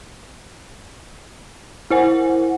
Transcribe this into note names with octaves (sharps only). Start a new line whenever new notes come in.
E4 A#4 C5 F#5 G#5